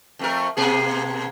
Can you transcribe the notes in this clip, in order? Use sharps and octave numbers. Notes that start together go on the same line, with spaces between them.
F2 A3 A#4
B2 A#3 G#4